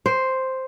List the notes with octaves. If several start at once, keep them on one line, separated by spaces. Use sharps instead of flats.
C5